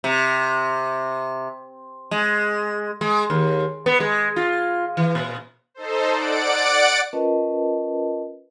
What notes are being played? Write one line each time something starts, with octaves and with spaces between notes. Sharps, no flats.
C3
G#3
G#3
D#2
B3
G#3
F4
E3
A#2
D#4 A4 C5
D5 F#5 D7
C#4 F4 A#4 B4 D#5 A5